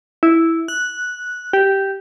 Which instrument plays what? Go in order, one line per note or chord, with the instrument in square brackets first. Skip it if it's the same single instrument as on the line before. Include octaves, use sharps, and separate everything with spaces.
[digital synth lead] E4
F#6
G4